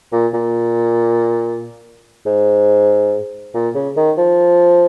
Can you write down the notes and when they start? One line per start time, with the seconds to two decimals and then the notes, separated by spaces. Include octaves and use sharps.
0.12 A#2
0.34 A#2
2.26 G#2
3.54 A#2
3.75 C#3
3.97 D#3
4.17 F3